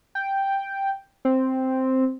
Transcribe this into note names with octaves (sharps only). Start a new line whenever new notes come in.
G5
C4